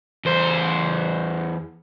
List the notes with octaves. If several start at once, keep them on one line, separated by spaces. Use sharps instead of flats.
E2 C5